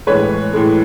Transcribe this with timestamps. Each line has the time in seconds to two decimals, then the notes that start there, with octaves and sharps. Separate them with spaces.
0.07 A2 E3 G#3 B4 C#5
0.53 A2 E3 G#3